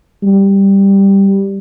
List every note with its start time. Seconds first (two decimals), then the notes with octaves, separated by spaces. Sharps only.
0.23 G3